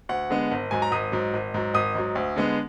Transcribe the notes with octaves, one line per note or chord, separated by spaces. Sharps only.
D2 F#5
D3 G#3 B3
G#1
G#2 F#3 G#5
A#5
G#1 D#6
G#2 F#3
G#1
G#2 F#3
G#1 D#6
G#2 F#3
D2
D3 G#3 B3